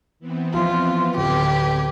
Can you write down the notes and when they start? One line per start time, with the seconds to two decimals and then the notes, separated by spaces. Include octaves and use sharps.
0.19 E3 B3 C4
0.54 F3 E4 F4
1.17 D1 G4 B4 G#6